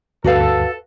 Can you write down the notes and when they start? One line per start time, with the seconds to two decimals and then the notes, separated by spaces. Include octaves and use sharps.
0.24 D2 G2 F#4 A4 B4 F5